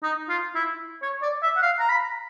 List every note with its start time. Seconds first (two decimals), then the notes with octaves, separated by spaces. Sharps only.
0.03 D#4
0.29 F4
0.55 E4
1.02 C#5
1.22 D5
1.42 E5
1.56 F#5
1.62 F5
1.80 A#5
1.89 B5